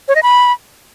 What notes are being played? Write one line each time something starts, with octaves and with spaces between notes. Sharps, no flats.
C#5
D#5
B5